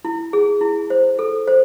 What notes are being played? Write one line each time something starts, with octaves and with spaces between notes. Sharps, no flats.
E4
G#4
E4
C5
A4
C5